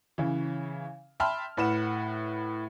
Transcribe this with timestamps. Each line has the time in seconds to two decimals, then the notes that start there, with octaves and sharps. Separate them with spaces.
0.18 C#3 E3
1.20 E5 G5 A5 B5 C6 F6
1.57 A2 B4 F#5 E7